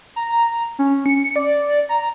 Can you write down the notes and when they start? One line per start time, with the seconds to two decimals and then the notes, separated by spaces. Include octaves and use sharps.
0.16 A#5
0.32 A#5
0.79 C#4
1.06 C#7
1.36 D5
1.89 A#5